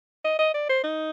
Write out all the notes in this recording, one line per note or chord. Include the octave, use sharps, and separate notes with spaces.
D#5
D#5
D5
C5
D#4